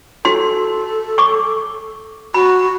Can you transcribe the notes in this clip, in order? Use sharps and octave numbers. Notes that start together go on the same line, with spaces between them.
F#4 A4 C6
C#6 D6
F#4 B5